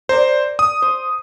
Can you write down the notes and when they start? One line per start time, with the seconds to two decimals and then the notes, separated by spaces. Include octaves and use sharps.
0.09 A#4 C5 D5
0.59 D#6
0.82 C5